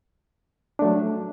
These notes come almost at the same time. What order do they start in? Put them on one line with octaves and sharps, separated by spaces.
D4 A3 F#3